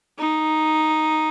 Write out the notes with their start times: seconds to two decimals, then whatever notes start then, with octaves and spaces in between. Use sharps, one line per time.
0.19 D#4